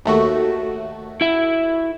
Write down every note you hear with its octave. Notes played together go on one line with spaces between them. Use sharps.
D#2 A3 F#4
E4 E5